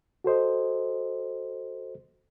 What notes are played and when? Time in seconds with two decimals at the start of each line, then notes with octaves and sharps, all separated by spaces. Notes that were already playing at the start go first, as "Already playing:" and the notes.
0.24 F#4 A4 C5 D#5